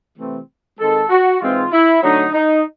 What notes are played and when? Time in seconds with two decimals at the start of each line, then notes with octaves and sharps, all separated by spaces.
0.17 C3 E3 A3 C4
0.78 D#3 G#3 C4 A4
1.10 F#4
1.40 G#2 E3 G#3 C4 F4
1.71 E4
2.02 D3 F#3 A3 D4 D#4
2.33 D#4